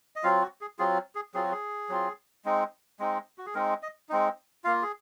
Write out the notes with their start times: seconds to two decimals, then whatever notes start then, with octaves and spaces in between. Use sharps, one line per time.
0.16 D#5
0.23 F#3 C4 F4 F5
0.42 F#4
0.61 G#4
0.79 F#3 C4 F4 G#4
1.15 G#4
1.34 F#3 C4 F4 G#4
1.43 F#4
1.52 G#4
1.89 F#3 C4 F4
2.45 G#3 C4 D#4
2.99 G#3 C4 D#4
3.38 F#4
3.46 G#4
3.54 G#3 C4 D#4 A#4
3.83 D#5
4.09 G#3 C4 D#4
4.64 A#3 F4 F5
4.82 G#4